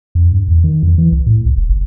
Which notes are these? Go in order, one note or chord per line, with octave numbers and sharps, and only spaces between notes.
F2
G2
E2
D#3
F2
E3
C2
A2
C2
E1
F#1